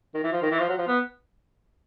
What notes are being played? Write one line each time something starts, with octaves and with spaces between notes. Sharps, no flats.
D#3
E3
F3
D#3
E3
F3
F#3
F3
B3